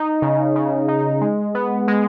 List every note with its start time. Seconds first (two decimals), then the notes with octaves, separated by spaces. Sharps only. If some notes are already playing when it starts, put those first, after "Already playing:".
Already playing: D#4
0.22 C#3
0.56 C#3
0.88 D#4
1.21 G#3
1.55 B3
1.88 G#3